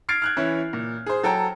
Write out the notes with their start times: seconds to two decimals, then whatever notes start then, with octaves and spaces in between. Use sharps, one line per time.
0.09 F6 G#6 A6 C7 D7
0.22 F6 F#6 G#6
0.36 E3 C#4 E4
0.73 A#2
1.06 G#4 C5
1.23 F#3 A4 G5 A#5